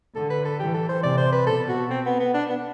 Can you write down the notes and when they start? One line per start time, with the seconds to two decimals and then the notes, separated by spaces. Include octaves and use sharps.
0.15 D3 A4
0.30 B4
0.45 A4
0.59 E3 G4
0.74 A4
0.89 C5
1.03 C3 D5
1.18 C5
1.32 B4
1.47 B2 A4
1.69 F#4
1.90 C4
2.06 B3
2.20 B3
2.34 D4
2.49 B3